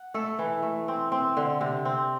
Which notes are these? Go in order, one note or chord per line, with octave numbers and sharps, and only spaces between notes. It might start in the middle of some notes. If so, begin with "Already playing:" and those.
Already playing: F#5
A3 A4
E3
A3
C4
C4
D3
C3
C4